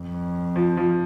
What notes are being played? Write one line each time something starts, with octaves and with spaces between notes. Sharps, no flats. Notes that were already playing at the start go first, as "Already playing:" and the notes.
Already playing: F2
F3
F3